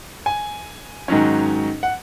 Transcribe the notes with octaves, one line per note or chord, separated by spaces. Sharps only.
G#5
G#2 D#3 F#3 C#4
F#5